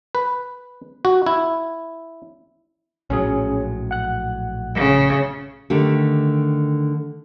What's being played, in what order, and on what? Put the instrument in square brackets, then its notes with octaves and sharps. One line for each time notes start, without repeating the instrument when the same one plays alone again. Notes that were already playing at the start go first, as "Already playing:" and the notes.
[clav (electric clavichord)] B4
F#4
E4
[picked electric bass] A#1 A2 F#3 [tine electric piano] C#4 G#4
[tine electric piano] F#5 F#6
[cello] C#3
[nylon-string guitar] D3 D#3 A3 G4